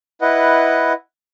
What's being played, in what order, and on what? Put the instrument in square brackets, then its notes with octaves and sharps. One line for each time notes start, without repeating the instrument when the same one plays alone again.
[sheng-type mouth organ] E4 B4 D#5 F#5